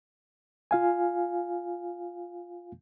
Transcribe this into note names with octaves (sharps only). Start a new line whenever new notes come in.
F4 F5 G#5